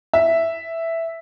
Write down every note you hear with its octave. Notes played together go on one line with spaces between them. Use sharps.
E5